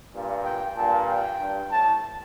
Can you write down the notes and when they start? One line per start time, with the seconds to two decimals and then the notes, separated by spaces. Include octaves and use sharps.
0.13 G2 A#2
0.45 G5
0.76 G2 A#2 A5
1.09 G5
1.39 G2
1.71 A2 A5